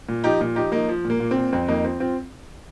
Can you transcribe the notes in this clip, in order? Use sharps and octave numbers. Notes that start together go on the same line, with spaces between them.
A#2
F3 D#4 G4
A#2
F3 D#4 G4
F3 A#3 D#4
F3
A#2
A#3
A#2
C4
A#2
F2 C4
F2 A#3 D#4
F3 C4
C4 F4